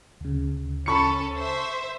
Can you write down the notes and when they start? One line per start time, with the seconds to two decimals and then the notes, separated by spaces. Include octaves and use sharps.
0.21 D2 C#3
0.86 C#4 A4 B5 C#6 C#7
1.37 C5 E5